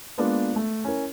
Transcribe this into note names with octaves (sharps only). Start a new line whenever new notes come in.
G#3 A#3 B3 D4 F4 D5
A3
C#4 E4 A#4